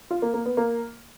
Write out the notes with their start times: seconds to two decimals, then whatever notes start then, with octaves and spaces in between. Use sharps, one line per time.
0.11 F4
0.22 A#3
0.34 A#3
0.46 B3
0.57 A#3